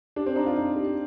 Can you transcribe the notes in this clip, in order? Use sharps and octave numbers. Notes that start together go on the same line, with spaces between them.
D4 G4
C4
D4 D#4
F4
D#4
G4